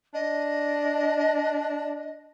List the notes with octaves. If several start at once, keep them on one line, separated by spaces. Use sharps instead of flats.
D4 D#5